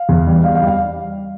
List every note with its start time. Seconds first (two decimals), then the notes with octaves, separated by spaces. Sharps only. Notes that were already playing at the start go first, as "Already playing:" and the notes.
Already playing: F5
0.09 E2
0.27 G3
0.43 G3 F5
0.55 F5
0.61 G3
0.67 F5